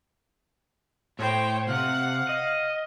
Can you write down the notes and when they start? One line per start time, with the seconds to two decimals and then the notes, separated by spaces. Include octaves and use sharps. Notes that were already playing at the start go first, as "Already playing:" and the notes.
1.19 A2 C5 C#5 G5
1.69 C3 F5 F#5
2.29 D#5